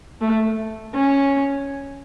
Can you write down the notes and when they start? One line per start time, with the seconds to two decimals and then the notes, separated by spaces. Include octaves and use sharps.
0.21 A3
0.95 C#4